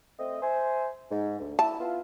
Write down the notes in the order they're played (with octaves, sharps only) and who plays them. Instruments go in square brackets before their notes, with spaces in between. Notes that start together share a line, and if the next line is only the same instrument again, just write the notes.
[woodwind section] A3 C4 D#5
C5 E5 G#5
G#2
D2
[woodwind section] E4 [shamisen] A5
[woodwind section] B3 E4 F4